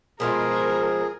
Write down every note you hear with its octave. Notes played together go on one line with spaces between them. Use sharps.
B2 F3 G#3 G#4 A#4